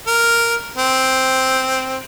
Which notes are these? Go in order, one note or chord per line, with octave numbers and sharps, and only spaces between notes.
A#4
C4